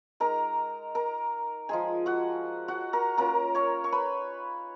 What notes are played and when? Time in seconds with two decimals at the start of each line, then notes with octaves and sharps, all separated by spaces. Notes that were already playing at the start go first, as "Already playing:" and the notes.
0.20 G#3 D#4 A#4 A#5
0.95 A#4 A#5
1.69 F3 G#3 D#4 G#4 G#5
2.06 F#4 F#5
2.68 F#4 F#5
2.93 A#4 A#5
3.17 A#3 C#4 F4 A#4 A#5
3.55 C#5 C#6
3.84 C#6
3.92 B4 B5